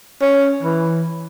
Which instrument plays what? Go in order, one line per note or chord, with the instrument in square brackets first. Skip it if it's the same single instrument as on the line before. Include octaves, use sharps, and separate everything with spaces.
[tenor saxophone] C#4
E3